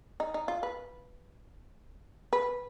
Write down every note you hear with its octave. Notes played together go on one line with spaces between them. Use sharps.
D#4
D#4
F4
B4
B4